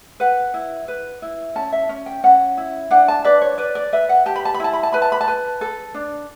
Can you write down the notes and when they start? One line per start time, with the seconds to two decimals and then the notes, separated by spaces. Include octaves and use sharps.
0.20 B4 F#5
0.54 E4
0.88 B4
1.22 E4
1.55 C#4 A5
1.73 E5
1.89 C#4
2.06 G5
2.23 C#4 F#5
2.57 E4
2.91 D4 F#5
3.08 A5
3.24 B4 D5
3.42 C#5
3.58 B4 D5
3.75 D5
3.93 B4 E5
4.09 F#5
4.26 G4 A5
4.36 B5
4.45 A5
4.54 B5
4.60 E4 A5
4.73 B5
4.83 A5
4.93 B4 B5
5.02 A5
5.12 B5
5.21 A5
5.28 B4
5.61 A4
5.94 D4